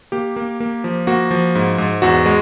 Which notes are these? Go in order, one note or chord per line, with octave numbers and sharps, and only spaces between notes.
A#3 G4
A#3
A#3
F3
A#3 F#4
F3
G#2
G#2
E2 F#4
G#3